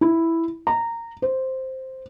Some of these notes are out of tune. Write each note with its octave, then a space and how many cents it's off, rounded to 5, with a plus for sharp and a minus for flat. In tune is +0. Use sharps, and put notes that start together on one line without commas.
E4 +0
A#5 -15
C5 +0